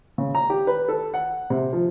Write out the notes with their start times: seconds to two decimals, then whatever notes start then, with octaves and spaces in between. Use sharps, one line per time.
0.18 C#3
0.35 A#5
0.50 G4
0.67 B4
0.88 A4
1.14 F#5
1.50 C3
1.73 F3